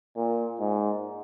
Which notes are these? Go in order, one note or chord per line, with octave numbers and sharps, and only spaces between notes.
A#2
G#2